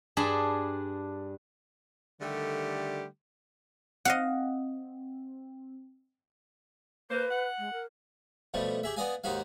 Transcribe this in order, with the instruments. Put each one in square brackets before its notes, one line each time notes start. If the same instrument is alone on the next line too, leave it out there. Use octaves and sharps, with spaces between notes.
[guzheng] G2 D4 G#4 A5 B5
[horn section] D3 D#3 G3 A3 G4
[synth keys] C4 [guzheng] D#5 F5 F#5
[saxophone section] A#3 C5 [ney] B4
[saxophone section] F#5
[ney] G#3
A#4
[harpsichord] B2 F3 G3 A3
G4 G#4 E5
B3 D5 D#5 F5 G#5
D#2 G#2 D#4 F#4 G4 F5